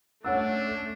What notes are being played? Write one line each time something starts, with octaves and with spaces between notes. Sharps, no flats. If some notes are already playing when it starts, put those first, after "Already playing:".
A3 C#4 D4 C#5 F#5 E6